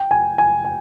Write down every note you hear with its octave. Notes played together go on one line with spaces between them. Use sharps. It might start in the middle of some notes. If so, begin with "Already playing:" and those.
Already playing: G5
G#5
G#5
G#5